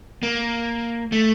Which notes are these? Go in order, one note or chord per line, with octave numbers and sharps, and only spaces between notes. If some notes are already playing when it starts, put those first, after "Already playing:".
A#3
A3